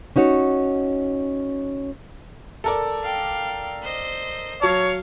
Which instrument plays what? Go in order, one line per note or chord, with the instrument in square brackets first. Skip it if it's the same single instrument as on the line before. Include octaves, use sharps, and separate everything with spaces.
[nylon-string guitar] C#4 D#4 F#4 C#5
[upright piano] A4 A#4 D5
[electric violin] F5 G5
C5 D#5
[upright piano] F#3 A5 [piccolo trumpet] C#5 [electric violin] F5